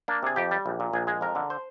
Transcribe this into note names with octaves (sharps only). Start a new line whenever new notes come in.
A#3 D4
C3 G#4
F2 G4
G3
A#1
A#2
A#1 G#4
G#3 G#4
F2 A#4
D3
C5